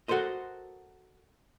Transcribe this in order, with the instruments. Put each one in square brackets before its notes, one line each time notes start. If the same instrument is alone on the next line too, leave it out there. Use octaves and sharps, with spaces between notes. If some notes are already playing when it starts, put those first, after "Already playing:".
[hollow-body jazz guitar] F#4 A4 A#4 C5 D#5